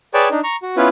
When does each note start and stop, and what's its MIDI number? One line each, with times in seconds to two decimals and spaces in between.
0.14 0.29 68
0.14 0.29 71
0.14 0.29 73
0.14 0.29 74
0.14 0.29 79
0.14 0.29 81
0.31 0.40 62
0.31 0.40 63
0.43 0.56 82
0.43 0.56 85
0.63 0.76 66
0.77 0.89 59
0.77 0.89 61
0.77 0.89 64
0.77 0.89 65
0.77 0.89 71